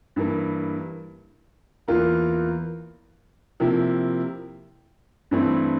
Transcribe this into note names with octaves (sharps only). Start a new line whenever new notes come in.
G2 E3 A#3
E2 E3 A#3 F4 A#4
C3 F3 A#3 E4
G2 E3 A3 C4 E4